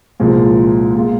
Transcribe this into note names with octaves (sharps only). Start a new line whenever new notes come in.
C2 A#2 F3 G#3
A#2 G#3 F4